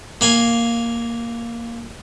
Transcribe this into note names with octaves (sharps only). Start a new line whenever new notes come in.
A#3 F5 G#5